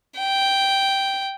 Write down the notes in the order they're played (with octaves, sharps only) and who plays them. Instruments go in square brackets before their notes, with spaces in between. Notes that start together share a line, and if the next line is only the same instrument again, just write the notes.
[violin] G5